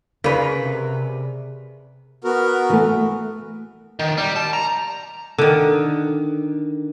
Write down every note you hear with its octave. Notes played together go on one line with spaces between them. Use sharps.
C#3 G#4 A#4 B4 D5
C3
B3 F#4 A#4
E3 A3
D#3
G3
A5
A#5
D3 D#3